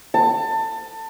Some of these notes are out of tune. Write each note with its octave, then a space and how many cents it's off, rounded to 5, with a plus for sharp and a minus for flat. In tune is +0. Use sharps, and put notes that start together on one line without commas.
A5 +25